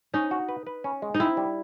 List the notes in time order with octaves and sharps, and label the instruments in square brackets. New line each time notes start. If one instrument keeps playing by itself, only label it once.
[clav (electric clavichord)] C#4 [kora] D#4
[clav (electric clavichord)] F#4
B4
B4
C#4
G#3
[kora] D#4
[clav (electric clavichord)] C4 [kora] E4
[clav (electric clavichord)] G3